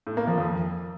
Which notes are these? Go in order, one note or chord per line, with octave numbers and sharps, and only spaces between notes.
A2
A#3
F3
F2